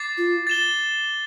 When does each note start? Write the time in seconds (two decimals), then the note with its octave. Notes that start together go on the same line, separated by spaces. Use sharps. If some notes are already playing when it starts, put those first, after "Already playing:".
Already playing: D6 A6 C7
0.18 F4
0.47 A6 E7 G7